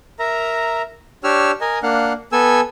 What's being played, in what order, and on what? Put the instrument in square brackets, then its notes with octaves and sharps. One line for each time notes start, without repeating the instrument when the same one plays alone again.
[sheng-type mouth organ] A#4 E5 A#5
D4 G4 C#5 E6 F6
A#4 D#5 G#5
A#3 D4 F5 F#5
B3 A4 G#5 E6